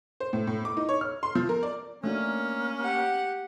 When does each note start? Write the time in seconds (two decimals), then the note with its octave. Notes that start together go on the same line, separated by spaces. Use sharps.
0.20 C5
0.33 A2
0.47 A2
0.65 D6
0.77 D#4
0.89 C#5
1.01 F6
1.23 C6
1.35 F3
1.49 A#4
1.63 D5
2.04 A3 A#3 C#4 D4 F#4
2.82 G4 F#5